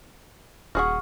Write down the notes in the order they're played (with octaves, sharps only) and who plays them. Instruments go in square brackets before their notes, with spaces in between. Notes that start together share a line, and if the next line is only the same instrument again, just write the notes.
[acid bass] D#1 [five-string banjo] F#4 G#4 F#5 [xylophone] C#6 F6